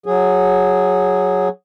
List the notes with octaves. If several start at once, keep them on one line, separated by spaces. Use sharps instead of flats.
F#3 G#4